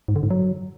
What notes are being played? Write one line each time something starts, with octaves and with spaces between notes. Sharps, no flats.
G#2
D3
G#2
F#3